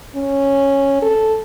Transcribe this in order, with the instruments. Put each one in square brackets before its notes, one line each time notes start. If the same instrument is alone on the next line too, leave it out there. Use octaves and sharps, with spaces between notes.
[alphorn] C#4
A4